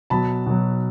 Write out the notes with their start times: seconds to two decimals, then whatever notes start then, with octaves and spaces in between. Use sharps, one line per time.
0.10 B2 F#3 A5 B5
0.46 B2 F#3